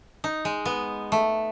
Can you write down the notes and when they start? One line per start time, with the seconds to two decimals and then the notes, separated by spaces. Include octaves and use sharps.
0.24 D#4
0.45 G#3
0.65 B3
1.12 A3